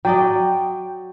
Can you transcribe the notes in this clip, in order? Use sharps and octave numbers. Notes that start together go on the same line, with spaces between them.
F#3 D5 D#5 G5